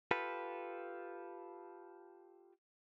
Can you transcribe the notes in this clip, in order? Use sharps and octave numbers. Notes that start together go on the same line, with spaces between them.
F4 G4 A4 B4